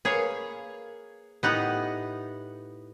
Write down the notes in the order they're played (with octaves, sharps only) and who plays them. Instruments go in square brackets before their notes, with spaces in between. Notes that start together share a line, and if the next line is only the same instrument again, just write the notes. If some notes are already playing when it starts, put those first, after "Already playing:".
[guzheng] A#3 B4 [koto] G#4 C#5 F5
[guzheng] A2 E4 G4 [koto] B3 D#4 F#5